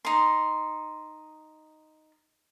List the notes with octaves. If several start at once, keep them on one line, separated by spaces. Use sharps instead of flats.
D#4 C6